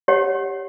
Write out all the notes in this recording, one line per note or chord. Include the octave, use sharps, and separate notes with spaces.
G4 C#5 F#5